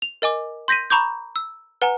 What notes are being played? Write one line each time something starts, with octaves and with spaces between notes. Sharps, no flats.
F7
A#4 D#5 G#5 D6
C6 G6 A#6 B6 D#7
A#5 B5 C#6 D6 G6
E6
B4 F#5 G#5 A#5